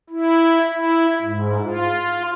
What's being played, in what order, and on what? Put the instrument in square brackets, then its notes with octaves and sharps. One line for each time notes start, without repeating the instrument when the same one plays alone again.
[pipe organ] E4
E4
G#2
F4